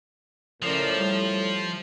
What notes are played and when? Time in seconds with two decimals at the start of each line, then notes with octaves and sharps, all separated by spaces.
0.62 A2 C#3 F3 A#4 D5
0.94 G3